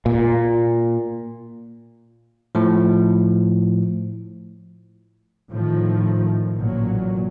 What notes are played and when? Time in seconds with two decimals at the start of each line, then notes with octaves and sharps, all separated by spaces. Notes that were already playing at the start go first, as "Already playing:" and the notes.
0.06 A#2
2.55 A2 F3
5.50 A2 D#3 F3
6.55 A1 A#2 F#3